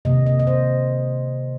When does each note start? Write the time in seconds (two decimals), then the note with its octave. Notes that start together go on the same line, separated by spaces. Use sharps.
0.05 C3 D#3 A#3 D#5
0.26 D#5
0.39 D#5
0.47 C5